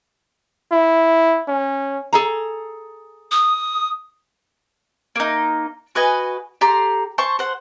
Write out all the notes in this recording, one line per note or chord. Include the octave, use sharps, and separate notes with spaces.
E4
C#4
G#4 A4 A#5
D#6
A#3 D#4
F#4 B4 D#5 G#5
G4 A4 A#5 C6
C5 A5 C#6
C5 F#5